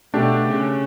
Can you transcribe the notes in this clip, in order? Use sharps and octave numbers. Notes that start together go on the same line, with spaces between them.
B2 A3 D4 G4
C#3